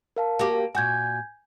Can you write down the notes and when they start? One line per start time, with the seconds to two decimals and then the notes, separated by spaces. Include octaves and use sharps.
0.16 A#4 F5 A5
0.39 A#3 F#4 G4
0.75 A#2 F#4 G#5 G6 G#6